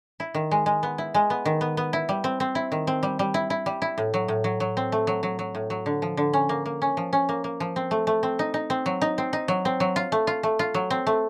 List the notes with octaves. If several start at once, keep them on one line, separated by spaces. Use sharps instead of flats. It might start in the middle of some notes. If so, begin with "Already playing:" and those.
E4
D#3
G#3
G#3
B3
E4
G#3
B3
D#3
B3
B3
E4
G3
C4
C4
E4
D#3
C4
G3
G3
E4
E4
G3
E4
A2
F#3
A2
F#3
F#3
C4
A3
F#3
F#3
F#3
A2
F#3
D3
F3
D3
C#4
A#3
A#3
C#4
F3
C#4
A#3
A#3
F3
C4
A3
A3
C4
D#4
D#4
C4
F#3
D#4
C4
D#4
F#3
C4
F#3
F4
A3
F4
A3
F4
F#3
C4
A3